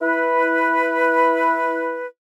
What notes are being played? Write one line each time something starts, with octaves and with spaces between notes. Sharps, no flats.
E4 B4